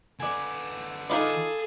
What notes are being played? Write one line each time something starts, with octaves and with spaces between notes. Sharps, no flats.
D3 B4 D5 G#5
D#4 F4 G#4 A4 D#5 F5 B5 D6